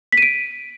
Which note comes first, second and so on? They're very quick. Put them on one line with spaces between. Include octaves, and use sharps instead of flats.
B6 D#7 D7